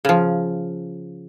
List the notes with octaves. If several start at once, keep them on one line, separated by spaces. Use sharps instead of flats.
C#3 F3